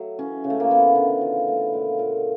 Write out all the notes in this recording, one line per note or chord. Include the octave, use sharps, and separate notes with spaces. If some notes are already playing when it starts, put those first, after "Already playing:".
Already playing: F#3 A3
E3 C#4
C#3
A3
A#3
E3 B3
D3
F3
A3
A#2
A#2